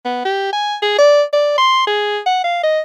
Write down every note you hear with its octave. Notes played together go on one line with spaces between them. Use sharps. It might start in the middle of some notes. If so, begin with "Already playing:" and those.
B3
G4
G#5
G#4
D5
D5
C6
G#4
F#5
F5
D#5